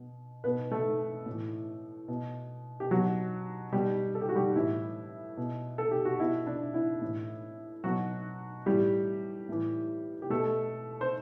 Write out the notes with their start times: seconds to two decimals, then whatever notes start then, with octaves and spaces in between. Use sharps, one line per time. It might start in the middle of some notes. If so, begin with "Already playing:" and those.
Already playing: B2
0.44 B2 B3 B4
0.71 A3 A4
1.26 A2
1.31 E3
2.08 B2
2.80 G4
2.91 B2 F#3 F#4
3.73 B2 G3 G4
4.15 A4
4.21 G4
4.29 F#4
4.35 G3 G4
4.56 A2 E3 E4
5.37 B2
5.78 A4
5.91 G4
6.05 F#4
6.20 B2 E4
6.47 D4
6.74 E4
7.01 A2 E3
7.84 B2 F#3 F#4
8.66 A2 E3 G3 G4
9.49 A2 E3
10.22 G4
10.30 B2 A3 A4
11.01 C5